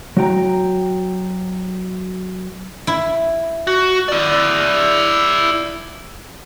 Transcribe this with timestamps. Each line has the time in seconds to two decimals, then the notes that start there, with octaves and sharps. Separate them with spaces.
0.17 F#3 F#4 G5 A#5
2.87 E4
3.67 F#4
4.08 E4 D5